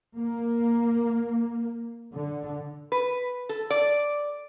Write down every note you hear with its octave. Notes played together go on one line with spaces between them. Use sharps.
A#3
D3
B4
A4
D5